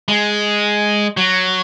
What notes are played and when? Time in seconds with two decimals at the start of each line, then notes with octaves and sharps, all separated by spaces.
0.08 G#3
1.17 F#3